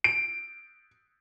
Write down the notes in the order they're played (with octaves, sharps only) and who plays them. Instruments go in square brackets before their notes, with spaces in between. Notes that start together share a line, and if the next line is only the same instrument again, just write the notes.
[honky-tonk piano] D7